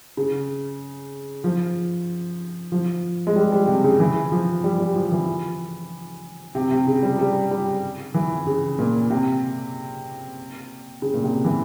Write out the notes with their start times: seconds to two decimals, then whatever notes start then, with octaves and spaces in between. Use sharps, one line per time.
0.17 C#3
1.44 F3
2.72 F3
3.27 G#3
3.36 G3
3.52 G3
3.67 C3
3.84 C#3
4.00 E3
4.32 F3
4.64 G3
4.80 G3
4.96 F3
5.12 E3
6.55 C3
6.71 C3
6.87 C#3
7.03 G3
7.19 G3
7.51 G3
8.14 E3
8.47 C#3
8.79 A#2
9.10 C3
11.02 C#3
11.14 A#2
11.24 C3
11.45 E3